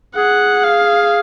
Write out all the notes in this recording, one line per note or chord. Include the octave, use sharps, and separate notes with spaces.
G#4 F#5
F5